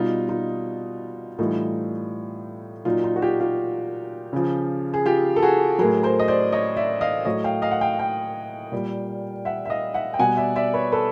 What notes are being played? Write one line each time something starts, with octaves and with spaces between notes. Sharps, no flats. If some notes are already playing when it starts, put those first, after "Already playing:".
Already playing: B2 G3 D#4 F4
D#4 F4
A2 E3 G3 D#4 F4
A#2 F#3 D#4 F4
D#4 F4
F#4
F4 G4
F4 G4
C#3 F3
G#4
F4 G4
A4
F#4 G#4
A2 F#3 G#4 A#4
A#4 C5
D#5
C5 D5
C#5 D#5
D5 E5
D#5 F5
A2 F#3 C#5 D#5
F5 G5
D#5 F5
F#5
F5 G5
F5 G5
A#2 G3
E5 F#5
E5
D#5 F5
E5 F#5
G5
B2 G3 F#5 G#5
D5 E5
D5 E5
B4 C#5
A4 B4